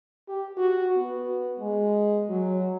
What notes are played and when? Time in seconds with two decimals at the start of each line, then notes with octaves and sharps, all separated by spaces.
0.28 G4
0.58 F#4
0.97 B3
1.60 G#3
2.30 F#3